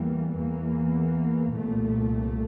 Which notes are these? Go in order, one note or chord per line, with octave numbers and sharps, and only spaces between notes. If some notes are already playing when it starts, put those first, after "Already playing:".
Already playing: E2 E3 G3 A#3
E2 E3 A#3
C2 A#2 A3